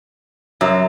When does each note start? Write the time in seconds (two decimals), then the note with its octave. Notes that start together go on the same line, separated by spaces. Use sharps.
0.61 F#2 F#3